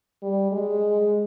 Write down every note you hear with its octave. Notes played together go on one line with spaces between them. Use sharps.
G3
G#3